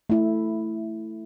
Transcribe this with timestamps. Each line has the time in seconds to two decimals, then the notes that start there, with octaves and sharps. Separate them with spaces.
0.10 A3 E4